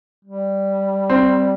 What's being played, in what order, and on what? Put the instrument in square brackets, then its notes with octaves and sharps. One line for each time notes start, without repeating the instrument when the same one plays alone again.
[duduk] G3
[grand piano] C4